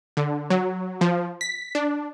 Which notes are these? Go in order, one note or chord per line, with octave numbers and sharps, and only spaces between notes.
D3
F#3
F3
B6
D4